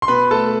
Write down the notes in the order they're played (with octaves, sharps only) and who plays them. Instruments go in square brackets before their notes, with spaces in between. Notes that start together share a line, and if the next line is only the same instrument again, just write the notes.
[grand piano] C6
B2 B4 B5
A3 A4 A5